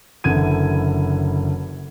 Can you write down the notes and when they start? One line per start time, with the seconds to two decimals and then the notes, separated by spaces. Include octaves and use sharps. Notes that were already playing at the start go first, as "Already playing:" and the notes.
0.24 F#1 D3 E3 G#6 D#7